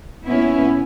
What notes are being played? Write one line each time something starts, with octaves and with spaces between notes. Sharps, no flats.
A#2 B3 C#4 E4